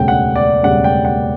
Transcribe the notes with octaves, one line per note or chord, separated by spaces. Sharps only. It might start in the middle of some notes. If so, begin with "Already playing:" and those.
Already playing: E1 D2 C#3 G3 G5
F#5
D5
E1 D2 C#3 G3 F#5
G5
F#5